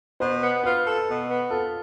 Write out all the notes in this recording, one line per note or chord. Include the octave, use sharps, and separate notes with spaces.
B2 C5
B3
F4 B4
A4
B2
B3
F4 A4